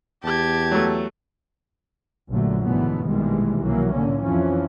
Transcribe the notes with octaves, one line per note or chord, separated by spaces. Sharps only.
E2 G4 A5 G#6
F#3 A3
A#1 F#2 D3 F#3 A3
G#2 B2 D3 E3 A3 B3
A#1 B2 D#3 E3 G3 G#3
C2 B2 E3 F#3 A#3
A2 D3 A#3 C#4
F2 E3 F3 C#4